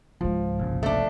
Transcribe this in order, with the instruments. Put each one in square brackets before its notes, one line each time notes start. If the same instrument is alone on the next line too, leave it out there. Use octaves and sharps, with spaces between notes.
[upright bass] C#2 G#2 [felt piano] F3
[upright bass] G1 [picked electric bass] C2 A#2 C#3
[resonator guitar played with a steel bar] A3 D4